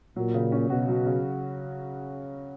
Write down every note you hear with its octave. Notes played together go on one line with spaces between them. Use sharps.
A#2 F#3
C#3
C#4
B2 F#4
F#3
C#3